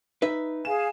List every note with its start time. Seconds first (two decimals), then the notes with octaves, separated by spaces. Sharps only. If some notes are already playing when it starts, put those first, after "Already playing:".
0.22 D#4 B4 E5
0.65 G#4 F5 G#5 E7